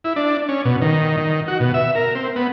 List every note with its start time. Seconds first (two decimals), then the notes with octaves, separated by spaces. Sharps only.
0.04 E4
0.16 D4
0.49 C#4
0.65 B2
0.81 D#3
1.17 D#3
1.48 F#4
1.60 B2
1.74 E5
1.95 A#4
2.15 C4
2.36 B3